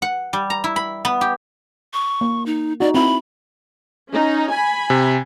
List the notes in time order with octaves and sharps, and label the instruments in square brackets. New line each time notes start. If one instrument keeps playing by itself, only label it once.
[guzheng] F#5
G3
A#5
E4
B5
B3
G4
[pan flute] C#6
[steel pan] A#3
[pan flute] D#4
[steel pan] D#4 F#4 [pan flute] D5
[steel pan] C4 E4 [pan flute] B5
[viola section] C#4 D#4
G#5 B5
[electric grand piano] C3